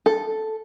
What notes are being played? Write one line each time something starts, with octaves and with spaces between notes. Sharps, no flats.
A4